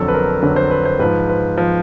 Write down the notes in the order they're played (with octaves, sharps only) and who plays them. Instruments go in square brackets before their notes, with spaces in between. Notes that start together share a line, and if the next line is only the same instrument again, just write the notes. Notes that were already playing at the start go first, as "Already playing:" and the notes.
Already playing: [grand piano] F2 D3 F#3 A4
B4
A#4
F2 D3 F#3 B4
C5
B4
C5
G#2 F3 B4
B4
F3